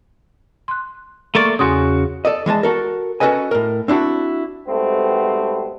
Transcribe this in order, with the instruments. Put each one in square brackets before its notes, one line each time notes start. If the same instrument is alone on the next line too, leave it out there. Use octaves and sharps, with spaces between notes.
[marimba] C6 F#6
[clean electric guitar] A3 A#3 D5 [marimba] C6 C#6 F6
[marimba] E2 C6 D#6 [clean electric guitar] C#3 F#4
[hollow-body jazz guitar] A4 D5 D#5
E3 G#3 D#5 A5
F#4 A4 A#4
C#4 F#4 A4 B4 D#5 G#5
A2 A#4
C4 D4 E4 F#4
[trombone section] G#2 B2 G3 A3 B3 C4